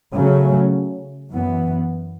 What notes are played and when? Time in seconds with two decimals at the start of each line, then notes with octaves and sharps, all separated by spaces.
0.14 C#3 F#3 A3 C#4
1.31 F#2 E3 B3